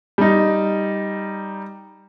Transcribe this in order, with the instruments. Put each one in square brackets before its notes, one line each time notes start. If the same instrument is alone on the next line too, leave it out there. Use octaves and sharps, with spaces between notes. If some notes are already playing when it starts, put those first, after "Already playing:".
[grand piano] G3 D#4